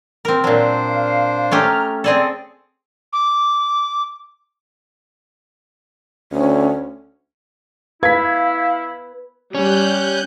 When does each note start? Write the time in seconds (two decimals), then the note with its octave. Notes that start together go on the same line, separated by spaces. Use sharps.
0.25 C4 A#4
0.44 A#2 F#3 D4 C5
0.86 F5
1.51 A3 C#4 G4 A#5 F6
2.04 C4 G#4 A4 D5
3.13 D6
6.32 D2 C#4
8.03 E4 B4 F5 G#6 B6
9.55 G3 C#4 F#6 G6